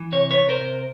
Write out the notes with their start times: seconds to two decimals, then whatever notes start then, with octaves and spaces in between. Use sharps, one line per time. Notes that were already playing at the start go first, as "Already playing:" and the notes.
Already playing: E3
0.12 C3 C#5
0.31 B4 C#5
0.37 C3
0.49 A#4 C5
0.61 C3